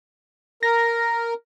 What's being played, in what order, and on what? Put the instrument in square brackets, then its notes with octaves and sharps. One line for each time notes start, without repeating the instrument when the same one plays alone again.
[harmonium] A#4 [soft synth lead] A#6